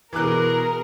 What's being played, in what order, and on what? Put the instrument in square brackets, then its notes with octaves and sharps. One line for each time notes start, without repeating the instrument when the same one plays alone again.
[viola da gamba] B2 G#4 [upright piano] E3 D6 F#6 [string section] A#4